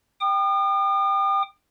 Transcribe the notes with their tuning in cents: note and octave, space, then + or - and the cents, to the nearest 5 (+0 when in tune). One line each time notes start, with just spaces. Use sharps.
G5 +0 D#6 -45